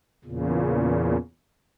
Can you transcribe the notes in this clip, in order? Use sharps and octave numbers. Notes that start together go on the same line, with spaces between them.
E2 A#2 C#3